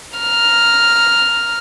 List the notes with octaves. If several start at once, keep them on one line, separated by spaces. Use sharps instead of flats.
A#5 F6